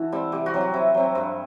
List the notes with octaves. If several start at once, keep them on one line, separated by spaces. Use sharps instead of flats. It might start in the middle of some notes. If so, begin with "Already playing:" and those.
Already playing: E3 F#4 A4
G3 C4
C3 G4
F#4
F#3 C4
F#4
C3 E4
F#3 C4
G2